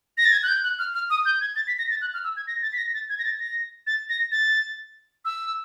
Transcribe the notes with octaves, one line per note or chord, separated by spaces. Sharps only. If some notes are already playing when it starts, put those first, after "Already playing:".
A#6
A6
G#6
F#6
G6
F#6
F6
F6
D#6
G6
G#6
A6
B6
A#6
A6
F#6
F6
E6
G#6
A#6
A6
B6
A#6
A6
G#6
A#6
A6
A#6
A6
A#6
A6
E6